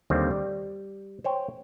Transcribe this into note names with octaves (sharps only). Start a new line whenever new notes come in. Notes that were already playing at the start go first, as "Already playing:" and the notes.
D#2 D3 D#3 G3 C4
G3
C5 C#5 G5